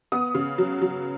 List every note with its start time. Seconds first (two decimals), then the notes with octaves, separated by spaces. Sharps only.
0.12 B3 D#6
0.35 C#3
0.58 F#3
0.81 F#3